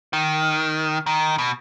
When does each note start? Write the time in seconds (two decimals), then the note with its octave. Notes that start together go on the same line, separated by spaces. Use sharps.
0.13 D#3
1.06 D#3
1.38 B2